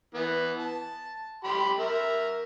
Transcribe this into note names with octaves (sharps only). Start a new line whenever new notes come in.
E3 B3
A5
G4 B5 C6
A#4 E5